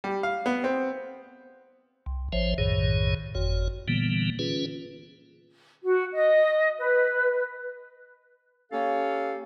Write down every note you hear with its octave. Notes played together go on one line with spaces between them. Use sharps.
G3
F5
B3
C4
C2
A1 F3 C5 C#5 E5
B1 F#2 A2 D#3 G#4 C#5
G1 F2 F#4 C#5
A#2 D3 E3 G3 A#3 B3
C#4 F4 G#4 B4
F#4
D#5
B4
A#3 C#4 G4 A4 C#5 F5